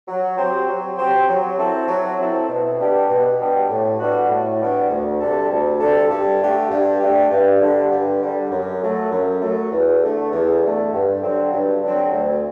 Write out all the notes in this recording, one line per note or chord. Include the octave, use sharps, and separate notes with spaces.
F#3
C4 G4 C5
F#3
C4 G4 C5
F#3
C4 E4 A4
F#3
C4 E4 A4
B2
G3 B3 D4 G4
B2
G3 B3 D4 G4
A2
G3 B3 D4 F#4
A2
G3 B3 D4 F#4
D2
C3 G3 D4 A4
D2
C3 G3 D4 A4
G2
D3 A3 D4 G4
G2
D3 A3 D4 G4
G2
D3 G3
G2
D3 G3
F#2
F#3 A3
F#2
F#3 A3
E2
D3 A3
E2
D3 A3
G2
D3 F#3 C4
G2
D3 F#3 C4
D2